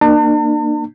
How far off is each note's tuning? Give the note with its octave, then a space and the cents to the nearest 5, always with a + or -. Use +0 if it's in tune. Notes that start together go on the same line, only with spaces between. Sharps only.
A#3 +0 D4 +40 A5 +45